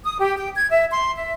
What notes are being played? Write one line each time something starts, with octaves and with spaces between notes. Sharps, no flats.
D#6
G4
G5
G#6
E5
C6
E5